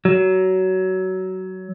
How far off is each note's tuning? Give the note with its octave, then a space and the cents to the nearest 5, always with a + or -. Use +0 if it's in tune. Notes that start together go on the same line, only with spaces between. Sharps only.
F#3 +20